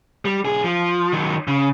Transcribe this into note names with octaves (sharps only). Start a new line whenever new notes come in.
G3
B1 G#4
F3
D#3 F#3
C#3